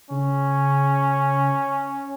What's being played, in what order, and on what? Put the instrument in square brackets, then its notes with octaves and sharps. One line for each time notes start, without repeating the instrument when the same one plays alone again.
[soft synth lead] C#3 [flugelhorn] C#4